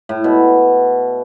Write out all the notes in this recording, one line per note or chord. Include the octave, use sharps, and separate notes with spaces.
A2
B2